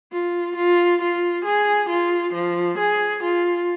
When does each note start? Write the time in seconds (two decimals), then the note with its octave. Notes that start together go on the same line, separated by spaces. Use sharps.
0.12 F4
0.56 F4
1.02 F4
1.45 G#4
1.90 F4
2.34 F3
2.78 G#4
3.23 F4